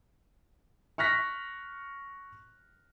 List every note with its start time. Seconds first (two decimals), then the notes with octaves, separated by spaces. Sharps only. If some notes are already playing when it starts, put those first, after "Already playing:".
0.98 C#6 F6 F#6 A#6 B6